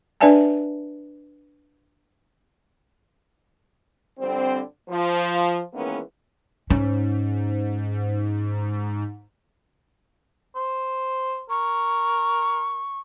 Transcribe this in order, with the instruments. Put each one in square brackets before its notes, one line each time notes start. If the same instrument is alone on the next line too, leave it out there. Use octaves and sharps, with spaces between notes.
[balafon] D4 B4 D5 E5 G#5 A5
[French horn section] F2 D3 G3 C4
F3
D#3 E3 G#3 A#3 B3 C#4
[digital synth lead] G#2 [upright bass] C#4
[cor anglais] C5
[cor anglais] A#4 [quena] C#6